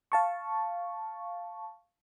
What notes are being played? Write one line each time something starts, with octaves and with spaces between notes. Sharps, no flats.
F5 A5 C#6